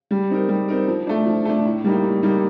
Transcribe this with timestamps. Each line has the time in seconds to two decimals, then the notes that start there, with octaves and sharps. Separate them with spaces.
0.11 G3
0.30 C4 D#4 A#4
0.49 G3
0.68 C4 D#4 A#4
0.88 F3
1.07 A3 D4
1.26 F3
1.45 A3 D4
1.65 A2
1.84 G3 A#3 D#4
2.04 A2
2.23 G3 A#3 D#4